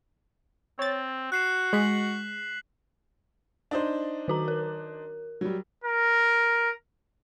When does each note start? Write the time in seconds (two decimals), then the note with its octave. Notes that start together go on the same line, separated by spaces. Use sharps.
0.79 C4 C#5 A6
1.32 F#4 F#6 C7 E7
1.73 G#3 B6 F#7
3.71 D4 D#4 C5
4.28 D#3 F#4 A#5
4.48 A#4
5.41 F#3 G3
5.84 A#4